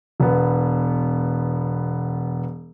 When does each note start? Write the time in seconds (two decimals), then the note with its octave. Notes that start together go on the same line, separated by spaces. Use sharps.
0.20 E1 B3